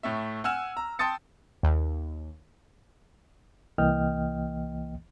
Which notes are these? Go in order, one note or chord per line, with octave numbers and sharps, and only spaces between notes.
A2 A3 E5
F#5 G#5 E6 F6 E7
A#5
G5 A5 C6 D#6 A6 C#7
D#2
C2 E3 A#3 D#5 G5 F6